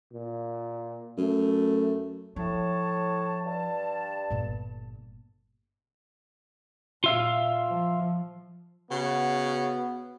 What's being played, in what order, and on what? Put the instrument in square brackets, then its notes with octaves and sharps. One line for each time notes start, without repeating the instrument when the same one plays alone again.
[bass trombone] A#2
[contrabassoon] F#2 [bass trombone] A3
[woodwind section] A2 C#5 A5 [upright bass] F3
[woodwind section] G2 A5
[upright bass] G1 A#2
[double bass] A#2 [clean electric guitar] F4 E5 F5
[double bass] F3
[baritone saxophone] C#3 [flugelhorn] B3 [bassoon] F#4